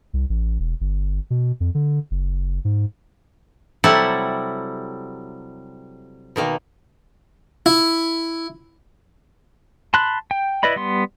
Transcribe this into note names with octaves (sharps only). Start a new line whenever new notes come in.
C2
A1
E1
G1
B2
F2
D3
F#1
G#2
C3 F#3 G3 E4 A4 F#5
B2 D#3 A#3
E4
A5 B5 C6 F#6
G5
E4 B4 D5 D#5 B5
G3 B3 C6